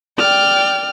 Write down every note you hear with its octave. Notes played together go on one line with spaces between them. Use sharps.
D5 G5 F6